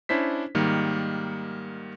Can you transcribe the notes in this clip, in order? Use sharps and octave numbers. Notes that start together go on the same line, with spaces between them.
C#4 D4 E4 C5 B6
G#2 D#3 G3 A#3